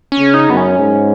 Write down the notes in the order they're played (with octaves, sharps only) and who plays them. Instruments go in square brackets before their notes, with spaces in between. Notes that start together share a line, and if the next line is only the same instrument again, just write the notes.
[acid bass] C#4
[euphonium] C#3
[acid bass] D#4
[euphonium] F#2 [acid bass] B3
[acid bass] C#4
[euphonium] G#2